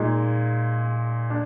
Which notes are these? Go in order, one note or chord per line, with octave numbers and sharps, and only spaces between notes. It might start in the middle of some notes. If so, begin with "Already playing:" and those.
Already playing: A#2 G#3 D#4
D4